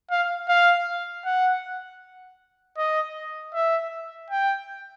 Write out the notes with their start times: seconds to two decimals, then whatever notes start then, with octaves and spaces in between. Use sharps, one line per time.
0.11 F5
0.49 F5
1.25 F#5
2.78 D#5
3.54 E5
4.30 G5